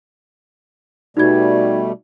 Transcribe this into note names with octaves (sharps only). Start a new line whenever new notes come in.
B2 G3 A3 D#4 F#4 G#6